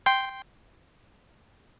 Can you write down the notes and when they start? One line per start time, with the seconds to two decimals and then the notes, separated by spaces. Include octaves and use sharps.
0.06 G5 C6 G6